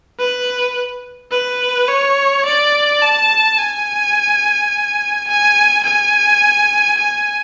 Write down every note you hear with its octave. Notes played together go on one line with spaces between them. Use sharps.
B4
B4
C#5
D5
A5
G#5
G#5
G#5
G#5